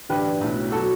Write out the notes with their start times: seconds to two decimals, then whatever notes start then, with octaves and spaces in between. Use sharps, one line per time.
0.09 A1 G2 D3 G3 G4 B4
0.41 B1 A2 F#3
0.72 B2 F#3 F#4 A4